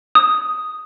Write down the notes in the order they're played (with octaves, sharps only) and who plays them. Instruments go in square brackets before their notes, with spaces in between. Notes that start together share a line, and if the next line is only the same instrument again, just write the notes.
[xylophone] D#6